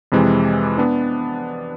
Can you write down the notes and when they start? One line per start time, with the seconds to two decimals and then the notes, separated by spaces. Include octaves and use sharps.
0.12 F2 C3 E3 G#3
0.78 B3 D4